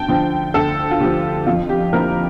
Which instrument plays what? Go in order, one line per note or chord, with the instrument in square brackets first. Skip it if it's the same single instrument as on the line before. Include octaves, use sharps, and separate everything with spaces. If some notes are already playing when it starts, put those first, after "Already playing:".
Already playing: [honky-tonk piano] D2 G5 A5
D3 F3
D2 A4
F4
D3 F3 G4
F2 F4
G4
D3 F3 A#3 E4 A#4